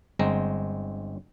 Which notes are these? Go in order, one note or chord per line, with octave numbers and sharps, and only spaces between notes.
G1 G#3 C4 A#5